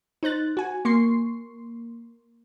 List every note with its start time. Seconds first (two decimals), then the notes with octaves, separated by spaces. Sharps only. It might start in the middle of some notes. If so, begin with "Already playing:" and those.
0.23 D#4 C5 F#6 A6
0.57 F#4 G#5
0.85 A#3 C6 C#6 C7